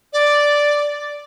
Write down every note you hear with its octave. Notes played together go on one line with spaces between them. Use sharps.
D5